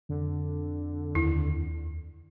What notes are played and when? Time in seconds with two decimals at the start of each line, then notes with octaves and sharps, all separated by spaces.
0.09 F2 D3
1.15 D#2 E4